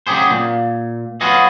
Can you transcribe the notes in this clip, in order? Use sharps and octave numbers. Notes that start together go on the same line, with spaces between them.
C#3 F#3 G#3 G4 G#4 C5
A#2
F#3 B3 F4 F#4 G#4 D#5